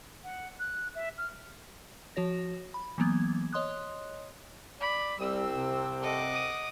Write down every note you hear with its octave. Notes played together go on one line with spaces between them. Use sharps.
F#5
F#6
E5
F6
F3 F#4 C#5 A#6
B5
E3 F#3 A#3 B3 G#6
C#5 D#5 C6 D#6 F#6
D5 B5
C2 G3 C4 E6
C3
A4 D#5 F#5 D6
D#6